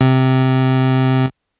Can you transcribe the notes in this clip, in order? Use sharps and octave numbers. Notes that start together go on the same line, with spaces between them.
C3